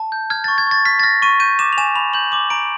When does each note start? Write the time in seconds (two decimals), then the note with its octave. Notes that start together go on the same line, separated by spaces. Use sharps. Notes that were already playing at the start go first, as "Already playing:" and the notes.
Already playing: A5
0.12 G6
0.30 F6 G#6
0.44 C#6 A6
0.58 G#6
0.67 C#6 A6
0.85 F6 B6
0.99 A6
1.03 F6 A#6
1.22 C#6 D#7
1.40 G6 D#7
1.59 D6 E7
1.73 F7
1.78 G#5 E7
1.95 B5 F7
2.14 G6 F#7
2.32 D6 F#7
2.50 A#5 D7